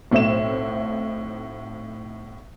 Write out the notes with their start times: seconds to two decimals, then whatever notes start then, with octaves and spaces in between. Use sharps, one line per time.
0.11 B1 A2 C4 E5 E7